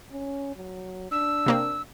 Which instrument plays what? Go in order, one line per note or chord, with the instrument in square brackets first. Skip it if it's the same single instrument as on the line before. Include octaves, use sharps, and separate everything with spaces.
[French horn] C#4
F#3
[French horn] D4 [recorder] E6
[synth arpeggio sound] C3 A#3 C4